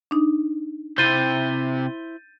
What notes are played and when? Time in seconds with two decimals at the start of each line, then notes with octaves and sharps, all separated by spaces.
0.11 D4 D#4
0.98 C3 E4 C5 G6 A6 D#7